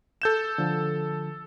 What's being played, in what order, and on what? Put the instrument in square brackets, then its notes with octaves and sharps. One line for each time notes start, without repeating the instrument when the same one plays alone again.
[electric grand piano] A4 G6 E7
[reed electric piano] D3 F3